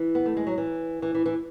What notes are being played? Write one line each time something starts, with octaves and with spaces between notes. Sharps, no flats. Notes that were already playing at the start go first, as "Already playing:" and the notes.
Already playing: E3
B3
A3
G#3
F#3
E3
E3
E3
E3